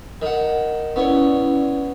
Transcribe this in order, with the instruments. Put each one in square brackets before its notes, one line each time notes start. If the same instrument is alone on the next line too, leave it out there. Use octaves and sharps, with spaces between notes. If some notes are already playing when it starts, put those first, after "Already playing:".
[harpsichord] D#3 F#5
[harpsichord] B3 C#5 [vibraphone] C#4 E4 D5